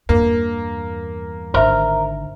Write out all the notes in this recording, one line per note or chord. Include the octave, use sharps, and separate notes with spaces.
E2 G2 A#3
G#1 D3 A#4 C5 E5